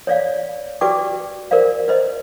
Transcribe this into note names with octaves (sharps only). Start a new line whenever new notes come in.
C#5 D5 F5
F#4 G4 B4 D5 G5 D6
A#4 C5 D5 F5
B4 C5 D#5